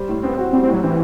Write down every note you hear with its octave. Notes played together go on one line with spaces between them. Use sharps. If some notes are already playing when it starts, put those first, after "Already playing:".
Already playing: G3 C5
A2
B3 C4
F#4
G3 C4
C4
A2 F#3
E3 C4